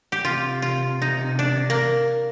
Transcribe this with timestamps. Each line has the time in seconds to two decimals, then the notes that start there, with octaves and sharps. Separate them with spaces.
0.12 G4
0.24 C3 F4
0.62 F4
1.01 C3 D#4
1.39 D4
1.70 A#3